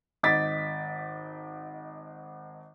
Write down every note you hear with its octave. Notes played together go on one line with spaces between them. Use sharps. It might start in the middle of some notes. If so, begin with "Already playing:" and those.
G#1 D#5 D6 A6 B6